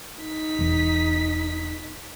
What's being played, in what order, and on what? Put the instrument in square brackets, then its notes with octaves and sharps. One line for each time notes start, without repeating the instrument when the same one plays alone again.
[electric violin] D#4 B6
[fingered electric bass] E1 E2